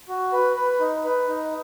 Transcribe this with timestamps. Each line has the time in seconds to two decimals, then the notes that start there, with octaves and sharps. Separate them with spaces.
0.08 F#4
0.32 B4
0.56 B4
0.80 D#4
1.04 B4
1.27 D#4